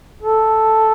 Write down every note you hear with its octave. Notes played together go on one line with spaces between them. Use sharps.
A4